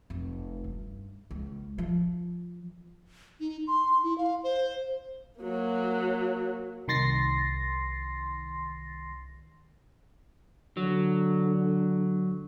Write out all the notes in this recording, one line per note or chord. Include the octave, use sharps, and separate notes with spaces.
F1
G2
C#2
F3
D#4
C6
E4
F5
C5
F#3 A#3
C2 D#3 C6 A6 A#6 C7
D3 F#3